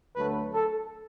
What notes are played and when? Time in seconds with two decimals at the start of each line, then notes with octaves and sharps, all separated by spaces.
0.15 D2 D3 F#3 A3 B4
0.53 A4